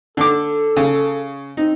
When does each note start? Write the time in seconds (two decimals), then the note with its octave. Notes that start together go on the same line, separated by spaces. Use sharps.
0.17 D3 A4 D6
0.76 C#3
1.57 C4 D#4